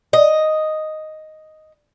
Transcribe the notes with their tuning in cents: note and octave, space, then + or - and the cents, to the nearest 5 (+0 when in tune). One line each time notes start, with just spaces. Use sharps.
D#5 +0